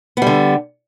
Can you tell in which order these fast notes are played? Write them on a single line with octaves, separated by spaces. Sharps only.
B3 G3 D3